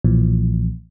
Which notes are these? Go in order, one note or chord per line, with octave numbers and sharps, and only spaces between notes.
B1 A#2 E3 F3